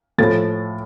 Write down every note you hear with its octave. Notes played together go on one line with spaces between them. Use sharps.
A2 F3 A3 A6